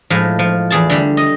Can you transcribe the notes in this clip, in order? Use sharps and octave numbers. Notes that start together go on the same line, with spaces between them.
A2 F3 G#3
F3
E2 G#4 A5
D3 G3
D#5